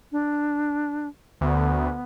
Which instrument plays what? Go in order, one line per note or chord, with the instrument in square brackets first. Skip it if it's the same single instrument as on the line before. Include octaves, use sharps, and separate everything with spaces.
[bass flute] D4
[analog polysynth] D2 [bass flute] B3